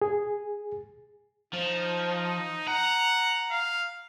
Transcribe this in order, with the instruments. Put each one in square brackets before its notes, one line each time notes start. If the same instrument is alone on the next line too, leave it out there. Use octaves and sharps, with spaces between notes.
[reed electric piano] G#4
[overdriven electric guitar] F3 [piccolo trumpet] D#4
[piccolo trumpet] F#5 [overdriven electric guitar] A#5
[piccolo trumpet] F5